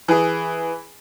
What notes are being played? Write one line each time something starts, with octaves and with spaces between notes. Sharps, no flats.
E3 G#4